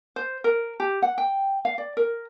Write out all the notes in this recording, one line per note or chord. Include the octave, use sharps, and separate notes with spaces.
C5
A#4
G4
F#5
G5
F5
D5
A#4